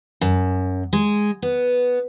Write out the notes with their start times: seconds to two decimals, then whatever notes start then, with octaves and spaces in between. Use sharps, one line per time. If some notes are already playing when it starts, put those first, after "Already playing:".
0.21 F#2
0.93 G#3
1.42 B3